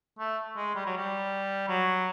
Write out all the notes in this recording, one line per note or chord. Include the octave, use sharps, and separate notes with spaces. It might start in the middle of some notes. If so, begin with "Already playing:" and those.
A3
G#3
G3
F#3
G3
F#3